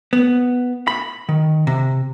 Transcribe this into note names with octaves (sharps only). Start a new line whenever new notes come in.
B3
B5
D#3
C3